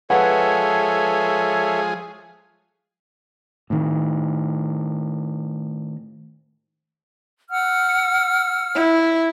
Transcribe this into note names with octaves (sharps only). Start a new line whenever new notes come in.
F3 G#3 G#4 A4 B4 C#5 E5 F#5
A2 D#3
F#5 E6 F6
E4